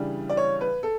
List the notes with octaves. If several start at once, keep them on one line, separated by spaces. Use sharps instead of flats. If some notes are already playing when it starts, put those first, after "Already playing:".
Already playing: C#3 E3 G3 D4
D5
C#5
B4
A4